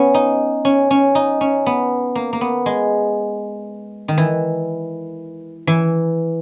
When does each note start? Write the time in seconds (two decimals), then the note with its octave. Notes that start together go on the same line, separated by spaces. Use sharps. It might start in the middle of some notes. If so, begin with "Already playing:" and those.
Already playing: B3 C#4
0.14 D#4
0.65 C#4
0.91 C#4
1.15 D#4
1.41 C#4
1.66 B3
2.15 A#3
2.33 A#3
2.41 B3
2.66 G#3
4.08 D#3
4.18 E3
5.67 E3